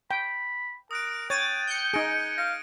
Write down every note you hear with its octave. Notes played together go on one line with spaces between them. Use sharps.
G5 B5
A#4 D#6 F#6 D7
C#5 G5 G#6 A6 D#7
G6 C#7
D#4 G#4 A#6 D7
F5 A#6